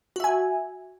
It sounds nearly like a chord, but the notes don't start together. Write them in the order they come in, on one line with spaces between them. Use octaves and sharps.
F#4 E5 G#5